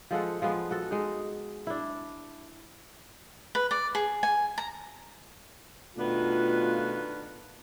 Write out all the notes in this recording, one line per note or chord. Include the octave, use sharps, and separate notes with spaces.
F3 G#3 A4 F#5
F3 G#3 B3
F#4 A4
G#3 D#4
D4 E4
B4
D5
G#4
G#5
A#5
B2 D#3 A3 B3 D4 F4